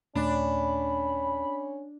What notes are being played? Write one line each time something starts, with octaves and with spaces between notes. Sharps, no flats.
D#2 A#2 A3 C#4 D4 B5